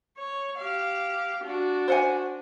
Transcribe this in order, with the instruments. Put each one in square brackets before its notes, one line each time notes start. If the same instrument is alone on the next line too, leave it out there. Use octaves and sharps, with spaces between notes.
[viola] C#5
G4 F5
D4 F#4
[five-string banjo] C5 F#5 G#5